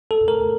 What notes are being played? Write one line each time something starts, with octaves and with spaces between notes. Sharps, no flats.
A4
A#4